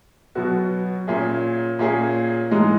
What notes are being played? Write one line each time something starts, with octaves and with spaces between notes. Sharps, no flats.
B2 F#3 B3 F#4
A#2 A#3 C#4 G#4
A#2 A#3 C#4 G#4
G#2 E3 G#3 D#4